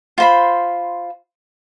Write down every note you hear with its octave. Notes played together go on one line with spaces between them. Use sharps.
F4 C5 B5